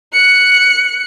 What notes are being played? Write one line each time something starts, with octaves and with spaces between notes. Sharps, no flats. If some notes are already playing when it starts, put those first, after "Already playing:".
F#6 C#7